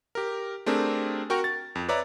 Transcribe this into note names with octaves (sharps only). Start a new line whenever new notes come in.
G4 A#4
A3 C4 D4 G4 G#4 A#4
F#4 A#4 G5 A#5 C#6
A6
F2
B4 C#5 D5 E5 A#5